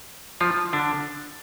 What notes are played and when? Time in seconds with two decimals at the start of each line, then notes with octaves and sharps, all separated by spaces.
0.41 F3 F4
0.73 D3 D4